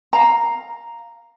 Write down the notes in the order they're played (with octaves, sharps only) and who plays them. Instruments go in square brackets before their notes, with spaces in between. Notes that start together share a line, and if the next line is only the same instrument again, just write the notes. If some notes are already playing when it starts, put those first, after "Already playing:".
[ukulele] F5 A#5